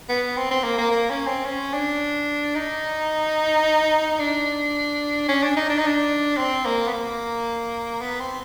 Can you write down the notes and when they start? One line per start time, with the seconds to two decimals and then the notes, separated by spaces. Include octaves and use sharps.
0.09 B3
0.37 C4
0.51 C4
0.64 A#3
0.78 A#3
0.91 A#3
1.10 C#4
1.27 C4
1.46 C#4
1.74 D4
2.56 D#4
4.19 D4
5.28 C#4
5.43 D4
5.57 D#4
5.70 D4
5.78 D#4
5.87 D4
6.38 C4
6.66 A#3
6.88 B3
6.93 A#3
8.01 B3
8.20 C4